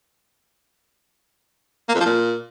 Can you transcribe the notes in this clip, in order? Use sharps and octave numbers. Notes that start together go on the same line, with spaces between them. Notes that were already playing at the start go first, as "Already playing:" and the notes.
A#3
F2
F3
A#2